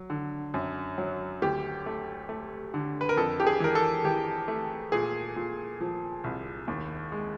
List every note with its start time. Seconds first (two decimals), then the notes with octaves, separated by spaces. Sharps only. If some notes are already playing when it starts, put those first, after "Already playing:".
Already playing: F#3
0.10 D3
0.54 F#2
0.98 F#3
1.42 D2 G4
1.86 A3
2.29 A3
2.74 D3
3.01 B4
3.09 A#4
3.17 F2 A4
3.40 G4
3.47 G#4
3.60 E3 A#4
3.75 A4
4.04 E3 G4
4.48 A3
4.92 A#2 G#4
5.36 A#2
5.81 F3
6.24 C2
6.68 D#2
7.12 G#3